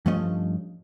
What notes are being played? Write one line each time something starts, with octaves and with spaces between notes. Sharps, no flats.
G2 F3 A3 C#4 D#5